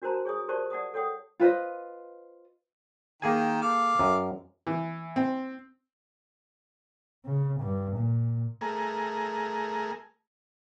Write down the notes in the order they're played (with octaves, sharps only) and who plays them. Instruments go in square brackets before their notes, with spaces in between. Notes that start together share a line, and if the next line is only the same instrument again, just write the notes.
[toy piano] D4 F#4 A#4 C5 A5 A#5
G#4 C#5 G#5 D#6
G4 A#4 C5 D5 A5 C#6
D5 F#5 A5 D#6
A4 C#5 F#5 G5 D#6
[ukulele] F4 B4 C5 D#5
[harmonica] D#3 A#4 G5 [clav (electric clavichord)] A#3 G#4 G#5
[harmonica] A4 F5 D6
[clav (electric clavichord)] F#2
[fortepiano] E3
C4
[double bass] C#3
G2
A#2
[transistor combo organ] A3 G#4 A#4